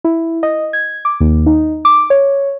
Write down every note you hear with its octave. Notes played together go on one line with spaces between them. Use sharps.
E4
D#5
G#6
D6
D#2
D#4
D6
C#5